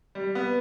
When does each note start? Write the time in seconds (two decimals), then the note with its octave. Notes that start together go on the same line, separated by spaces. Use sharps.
0.15 G3
0.35 B3